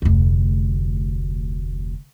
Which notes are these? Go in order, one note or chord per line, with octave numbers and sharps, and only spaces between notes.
F1 D2